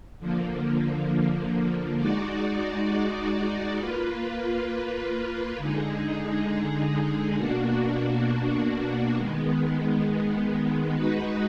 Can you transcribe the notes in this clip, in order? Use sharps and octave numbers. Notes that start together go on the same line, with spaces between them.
D3 F3 A#3
G#3 D#4 F#4 D5
A#3 F4 B4
D3 G#3 D#4 G#4
B2 A#3 D4 F#4
D#3 G#3 B3
G#3 D#4 F#4 B4